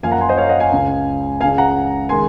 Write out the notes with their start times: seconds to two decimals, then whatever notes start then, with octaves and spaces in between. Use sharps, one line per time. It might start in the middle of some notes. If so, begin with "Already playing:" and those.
0.03 F#2 F3 A#3 F5 G#5
0.11 F#5 A#5
0.20 G#5 C6
0.29 C5 D#5
0.37 C#5 F5
0.49 D#5 F#5
0.60 F5 G#5
0.72 C#2 C#3 G#3
1.41 C#2 C#3 G#3 F5 G#5
1.58 F#5 A#5
2.09 D#3 G#3 G#5 C6